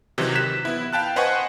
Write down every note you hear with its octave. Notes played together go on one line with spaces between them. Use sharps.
C3 D#3 E3 F#3 C4
F#6 B6 E7
B3 E4
F5 G5 A5 F#6
B4 C5 D#5 F#5 G#5 C#6